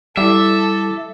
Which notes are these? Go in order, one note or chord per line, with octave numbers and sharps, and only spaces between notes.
G3 E4 A4 E5 D6